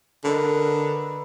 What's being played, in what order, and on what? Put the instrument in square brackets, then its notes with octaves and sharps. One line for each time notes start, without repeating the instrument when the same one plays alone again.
[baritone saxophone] D3 [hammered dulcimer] A#4 B4 D#5